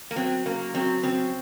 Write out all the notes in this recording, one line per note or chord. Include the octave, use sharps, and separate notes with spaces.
A#3
F#3 C4
C#3 A#3
F#3 C4
C#3 C4